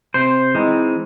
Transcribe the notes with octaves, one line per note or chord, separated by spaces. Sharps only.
C3 C5
E3 G#3 C4 D#4